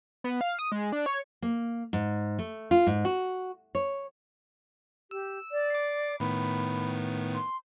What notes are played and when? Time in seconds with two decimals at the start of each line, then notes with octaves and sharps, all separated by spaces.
0.24 B3
0.41 F5
0.59 D#6
0.72 G#3
0.92 D4
1.06 C#5
1.42 A#3
1.93 G#2
2.39 A3
2.71 F4
2.87 G#2
3.05 F#4
3.75 C#5
5.11 G4 E6
5.52 D5
5.70 D6 C7
6.20 A2 D#3 B3 B5
7.34 C6